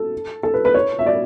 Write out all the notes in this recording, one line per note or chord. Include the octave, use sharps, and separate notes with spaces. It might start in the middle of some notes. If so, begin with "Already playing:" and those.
Already playing: A4
A4
B4
B4
C#5
E5
D5